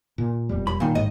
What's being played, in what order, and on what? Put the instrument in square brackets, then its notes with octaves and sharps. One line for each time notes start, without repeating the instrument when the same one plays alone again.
[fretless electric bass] A#2
E1 F2 G3
[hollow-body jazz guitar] B5
A#2 D#3
[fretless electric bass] A1 G#2 [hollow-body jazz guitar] D#5